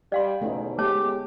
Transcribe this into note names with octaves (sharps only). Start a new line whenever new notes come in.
G3 D5 F5 C6
E2 G#2 B2 A3 C#4 D#4
G#3 A3 B3 G4 C#5 A5 D6